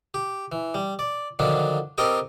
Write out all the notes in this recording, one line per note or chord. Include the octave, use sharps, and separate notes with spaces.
G4
E3
G3
D5
D3 D#3 F3 F#3 D4
C4 G4 A4 A#4 D#5 G5